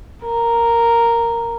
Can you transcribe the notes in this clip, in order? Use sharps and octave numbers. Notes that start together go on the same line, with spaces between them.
A#4